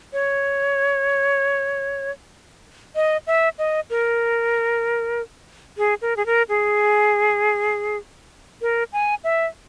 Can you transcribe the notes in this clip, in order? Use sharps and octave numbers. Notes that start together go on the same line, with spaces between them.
C#5
D#5
E5
D#5
A#4
G#4
A#4
G#4
A#4
G#4
A#4
G#5
E5